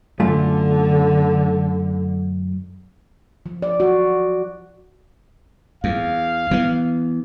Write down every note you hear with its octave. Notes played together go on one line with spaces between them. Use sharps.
F#2 D3 A3 F4
F3
D5
F#4
E2 F5
E3 B3